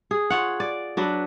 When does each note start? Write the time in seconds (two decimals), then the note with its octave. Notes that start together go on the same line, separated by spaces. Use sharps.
0.11 G#4
0.30 F4 C#5 F#5
0.60 D5
0.97 F#3 D4 B4